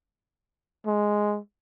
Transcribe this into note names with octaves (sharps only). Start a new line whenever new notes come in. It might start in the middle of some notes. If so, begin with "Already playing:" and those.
G#3